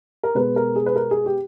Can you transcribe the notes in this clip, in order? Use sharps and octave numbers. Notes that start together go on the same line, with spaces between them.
A#4
B2 G#3 B3 B4
A#4
G#4
B4
A#4
G#4
G4